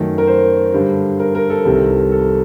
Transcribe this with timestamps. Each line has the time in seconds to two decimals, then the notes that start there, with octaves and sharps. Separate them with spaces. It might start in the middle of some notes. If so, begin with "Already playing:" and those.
Already playing: F#2 D#3 A3
0.18 A#4
0.27 C5
0.73 G2 D3 G3
1.19 A#4
1.35 A#4
1.50 A4
1.65 C2 C3 D#3
2.12 A4